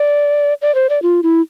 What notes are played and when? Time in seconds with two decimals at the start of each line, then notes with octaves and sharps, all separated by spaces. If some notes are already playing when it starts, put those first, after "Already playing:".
Already playing: D5
0.62 D5
0.75 C5
0.90 D5
1.02 F4
1.23 E4